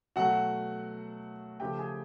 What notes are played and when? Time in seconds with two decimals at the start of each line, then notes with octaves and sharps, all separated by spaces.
0.16 B2 F#3 A3 F#4 F#5
1.60 C#3 F3 A3 G4 G5
1.78 G#4 G#5